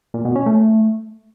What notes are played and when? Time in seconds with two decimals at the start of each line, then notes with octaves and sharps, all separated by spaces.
0.14 A#2
0.25 B2
0.35 C#4
0.46 A3